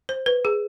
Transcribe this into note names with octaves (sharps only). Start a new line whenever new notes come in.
C5
B4
G#4